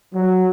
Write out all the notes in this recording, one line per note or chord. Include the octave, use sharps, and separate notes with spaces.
F#3